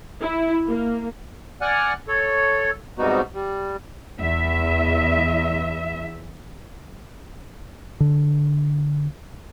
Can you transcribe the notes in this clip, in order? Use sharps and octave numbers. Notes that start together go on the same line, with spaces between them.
E4
A#3
D5 F#5 G#5 F6 F#6
A4 C#5
G#2 C3 G3 B3 D#4 F#4
G3
E2 E5
D3